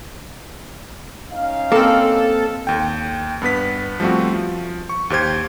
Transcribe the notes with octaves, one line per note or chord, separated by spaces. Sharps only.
C#4 D#4 F5
A#3 C4 A4
D#2 G5
G2 B3 B4 B6
F3 G3 A3 C4 F#4
F3
C#6
D#2 G4 C5 G#6